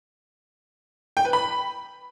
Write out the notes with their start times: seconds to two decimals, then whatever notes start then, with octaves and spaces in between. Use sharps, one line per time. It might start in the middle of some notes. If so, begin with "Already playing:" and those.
1.17 G5
1.25 B4
1.33 B5